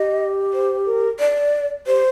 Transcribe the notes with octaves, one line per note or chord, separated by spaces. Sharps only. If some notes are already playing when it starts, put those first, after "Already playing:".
Already playing: G4 D#5
C5
A#4
D5
G4 C5